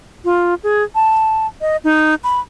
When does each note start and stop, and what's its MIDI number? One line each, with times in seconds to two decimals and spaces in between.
0.25 0.54 65
0.63 0.83 68
0.95 1.47 81
1.61 1.77 75
1.84 2.15 63
2.24 2.40 83